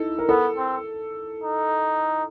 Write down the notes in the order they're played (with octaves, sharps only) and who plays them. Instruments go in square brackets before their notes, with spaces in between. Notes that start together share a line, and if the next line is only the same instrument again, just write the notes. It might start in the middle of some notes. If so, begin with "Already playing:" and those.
Already playing: [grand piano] D#4 E4 A4
A#4
[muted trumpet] B3 [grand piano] A4
[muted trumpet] C4
D#4